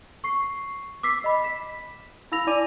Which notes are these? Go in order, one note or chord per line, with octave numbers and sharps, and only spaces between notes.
C#6 C7
D6 E6 B6 C7
D#5 B5
B6 E7
E4 F5 B5 E6 A#6 F7
E4 D5 G#5 D6 D#7